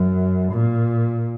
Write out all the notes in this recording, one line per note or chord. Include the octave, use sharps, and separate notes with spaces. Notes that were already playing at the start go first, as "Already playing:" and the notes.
Already playing: F#2
A#2